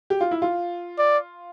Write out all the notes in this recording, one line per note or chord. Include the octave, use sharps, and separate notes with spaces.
G4
F4
E4
F4
D5